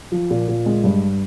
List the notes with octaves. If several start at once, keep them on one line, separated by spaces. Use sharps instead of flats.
F3
A#2
A#2
G#3
G2